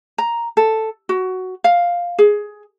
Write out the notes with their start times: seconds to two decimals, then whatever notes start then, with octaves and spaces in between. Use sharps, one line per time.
0.18 A#5
0.57 A4
1.09 F#4
1.64 F5
2.19 G#4